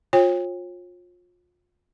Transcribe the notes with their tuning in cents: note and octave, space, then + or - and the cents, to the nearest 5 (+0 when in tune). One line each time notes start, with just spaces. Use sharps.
F4 +30 C#5 -40 G5 +40